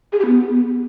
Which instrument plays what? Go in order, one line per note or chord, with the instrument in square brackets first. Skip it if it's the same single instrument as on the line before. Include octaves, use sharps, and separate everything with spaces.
[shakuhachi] G#4
G4
B3